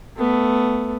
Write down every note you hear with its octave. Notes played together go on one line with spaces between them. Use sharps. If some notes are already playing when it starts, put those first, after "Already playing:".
A3 B3